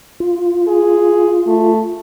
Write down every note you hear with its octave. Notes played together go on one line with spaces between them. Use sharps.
F4
G#4
A3